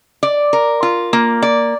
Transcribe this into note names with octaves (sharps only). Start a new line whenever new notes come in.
D5
A#4
F4
A#3
D5